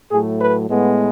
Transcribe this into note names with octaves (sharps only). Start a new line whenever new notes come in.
A2 F#3 A3 G#4
B4
A2 G#3 B3